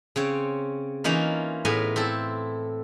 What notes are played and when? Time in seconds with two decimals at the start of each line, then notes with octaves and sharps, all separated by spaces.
0.16 C#3 C4 C#5
1.04 E3 A#3 C#4 D#4 F4
1.65 A2 B3 G#4 A#4 G#5
1.96 C4 E4 A4